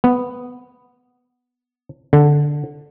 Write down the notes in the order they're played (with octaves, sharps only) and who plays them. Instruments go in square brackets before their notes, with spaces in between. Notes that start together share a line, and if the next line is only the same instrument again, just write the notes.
[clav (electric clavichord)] B3
D3